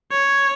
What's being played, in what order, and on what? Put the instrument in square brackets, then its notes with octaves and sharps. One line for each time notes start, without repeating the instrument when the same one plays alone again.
[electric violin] C#5